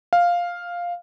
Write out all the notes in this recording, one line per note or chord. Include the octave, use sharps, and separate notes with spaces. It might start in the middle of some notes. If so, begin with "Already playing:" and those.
F5